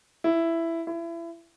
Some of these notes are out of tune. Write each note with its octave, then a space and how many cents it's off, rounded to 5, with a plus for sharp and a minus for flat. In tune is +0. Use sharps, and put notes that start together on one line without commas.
E4 +10
E4 +30